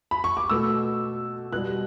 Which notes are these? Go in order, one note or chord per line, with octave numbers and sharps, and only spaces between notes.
B5
C#6
D6
B2 A3 E6
B2 G3 F#6